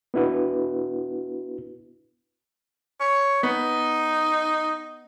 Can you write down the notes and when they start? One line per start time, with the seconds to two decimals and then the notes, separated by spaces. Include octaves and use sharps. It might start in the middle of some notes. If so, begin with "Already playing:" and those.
0.14 B3 D4 E4 F#4 B4
3.00 C#5
3.43 B3 D#4